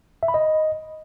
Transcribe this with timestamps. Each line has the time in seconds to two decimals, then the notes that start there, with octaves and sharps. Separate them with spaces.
0.23 E5
0.28 B5
0.34 D#5